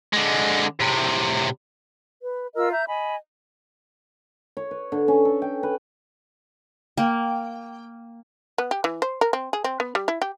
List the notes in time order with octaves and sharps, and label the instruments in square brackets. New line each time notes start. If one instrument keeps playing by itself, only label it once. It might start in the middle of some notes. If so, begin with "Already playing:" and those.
[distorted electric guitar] D3 G#3
A2 C3
[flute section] B4
F4 A#4 D#5 E6
E5 A#5 G6
D#5 G#5 B5
[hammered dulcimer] C#5
B4
D3
C#4
A4
G5
B4
[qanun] A#3 [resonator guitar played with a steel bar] G5
[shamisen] B3
G4
E3
C5
A#4
C4
G#4
C4
B3
G3
E4
G4